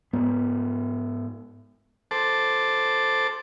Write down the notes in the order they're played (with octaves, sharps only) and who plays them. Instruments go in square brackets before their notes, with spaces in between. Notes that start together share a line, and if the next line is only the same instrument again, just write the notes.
[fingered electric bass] G#2 B3
[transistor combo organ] A4 C5 A5 D6